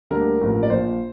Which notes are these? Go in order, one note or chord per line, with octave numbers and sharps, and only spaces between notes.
D2 D3 G3 A#3 D4 A#4
A1 G2 F3 A#3
D5
A#1 A#2 F3 C5